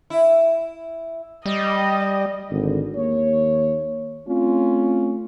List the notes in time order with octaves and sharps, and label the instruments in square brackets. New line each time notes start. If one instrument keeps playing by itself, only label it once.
[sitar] E4
[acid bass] G3 [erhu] D#5
[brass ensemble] G#1 D3
D#2 A#3 C#5
A3 C4 C#4 F4